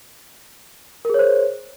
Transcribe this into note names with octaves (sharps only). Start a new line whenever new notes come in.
G#4 A#4 C5 C#5